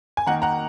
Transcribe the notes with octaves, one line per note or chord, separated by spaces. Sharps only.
G#5
D#3 A#3 D#4 F#5 A#5
F#5 A#5